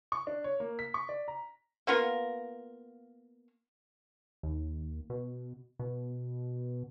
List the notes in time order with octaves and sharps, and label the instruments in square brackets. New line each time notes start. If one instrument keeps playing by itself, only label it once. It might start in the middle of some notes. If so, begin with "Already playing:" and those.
[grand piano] C#6
D4
C#5
A#3
B6
C#6
D5
A#5
[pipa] A#3 B3 F4 A#4
[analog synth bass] D#2
B2
B2